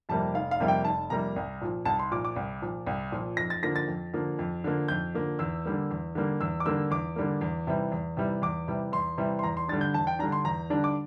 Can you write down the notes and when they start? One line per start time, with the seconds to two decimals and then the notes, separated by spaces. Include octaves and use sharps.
0.09 F2 C3 G3 A#3 A5
0.34 F1 F5
0.51 F5
0.60 F2 C3 G3 A#3
0.68 G5
0.84 F1 A5
1.10 F2 C3 G3 A#3 A#5
1.36 C2
1.61 A#2 F3
1.85 C2 A5
1.99 C6
2.11 A#2 F3 D6
2.25 D6
2.36 C2
2.62 A#2 F3
2.87 C2
3.12 A#2 F3
3.37 F2 A#6
3.50 A6
3.63 D3 F3 A#3 A#6
3.76 A6
3.88 F2
4.13 D3 F3 A#3
4.39 F2
4.64 D3 F3 A#3
4.88 F2 G6
5.14 D3 F3 A#3
5.39 E2 E6
5.65 D3 G3 A#3
5.91 E2
6.15 D3 G3 A#3
6.41 E2 E6
6.60 D6
6.65 D3 G3 A#3 E6
6.91 E2 D6
7.16 D3 G3 A#3
7.41 E2
7.67 C3 E3 G3
7.92 E2
8.17 C3 E3 G3
8.42 E2 D6
8.68 C3 E3 G3
8.92 E2 C6
9.18 C3 E3 G3
9.39 C6
9.43 E2 A#5
9.57 C6
9.68 D3 G3 D4 A6
9.81 G6
9.94 E2 A5
10.07 G5
10.19 D3 G3 D4 A#5
10.32 C6
10.44 E2 A#5
10.70 D3 G3 D4
10.84 D6